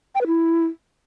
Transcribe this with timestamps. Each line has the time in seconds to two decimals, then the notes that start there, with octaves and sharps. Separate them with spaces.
0.15 G5
0.21 B4
0.27 E4